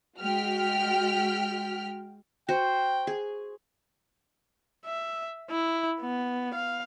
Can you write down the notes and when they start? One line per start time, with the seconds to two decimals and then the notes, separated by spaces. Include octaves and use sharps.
0.18 G#3 F#4 G5 F6 B6
2.49 F#4 C5 G5
3.07 G#4
4.85 E5
5.51 E4
6.00 B3
6.54 F5